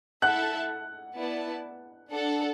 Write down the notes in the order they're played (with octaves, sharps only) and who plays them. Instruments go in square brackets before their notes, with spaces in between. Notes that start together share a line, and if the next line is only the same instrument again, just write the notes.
[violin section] E4 A4 E5 A5 [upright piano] F#5 F#6
[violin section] B3 E4 D5 A5
D4 A4 F#5